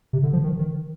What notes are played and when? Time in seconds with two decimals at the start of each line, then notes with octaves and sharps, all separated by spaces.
0.13 C3
0.23 D3
0.33 F3
0.44 D#3
0.59 D#3